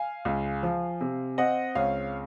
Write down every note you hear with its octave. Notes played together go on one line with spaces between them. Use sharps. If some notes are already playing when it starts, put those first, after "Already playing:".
Already playing: F5 G#5
C#2
F3
C3
C4 D#5 F#5
C#2 C#5 F5